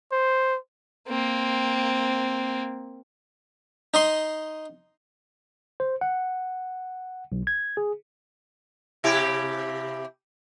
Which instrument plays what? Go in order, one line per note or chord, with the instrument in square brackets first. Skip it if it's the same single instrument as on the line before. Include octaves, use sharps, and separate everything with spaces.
[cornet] C5
[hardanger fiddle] A#3 C4
[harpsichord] D#4 D#5 C6
[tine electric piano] C5
F#5
B1
G#6
G#4
[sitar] C3 E4 G4